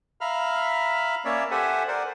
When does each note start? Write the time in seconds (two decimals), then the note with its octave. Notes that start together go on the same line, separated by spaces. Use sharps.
0.21 E5 F5 A#5 B5 F6
1.25 A#3 C#4 C#5 D5 E5
1.51 G4 A4 C5 E5 F#5 G#5
1.88 A#4 C5 D5 F#5